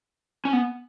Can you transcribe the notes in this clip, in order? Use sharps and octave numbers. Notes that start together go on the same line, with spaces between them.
C#4
B3